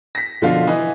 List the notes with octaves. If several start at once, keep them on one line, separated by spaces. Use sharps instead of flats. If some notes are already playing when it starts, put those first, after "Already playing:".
A#6 B6
B2 D3 F3 F4
E3 D#5